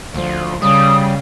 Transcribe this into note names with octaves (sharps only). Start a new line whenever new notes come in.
D2 F3
C#3 G3 D#6